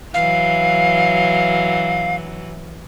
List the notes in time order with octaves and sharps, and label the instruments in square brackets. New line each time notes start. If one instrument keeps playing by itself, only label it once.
[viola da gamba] E3 F#3 [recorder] F5